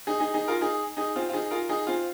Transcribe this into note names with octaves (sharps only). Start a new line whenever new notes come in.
D#4 G#4
D#4 G#4
D#4 G#4
F4 A#4
D#4 G#4
D#4 G#4
C4 F4
F4
D#4 G#4
F4 A#4
D#4 G#4
C4 F4